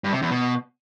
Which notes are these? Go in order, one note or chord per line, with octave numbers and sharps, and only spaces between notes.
G2
C3
E2
B2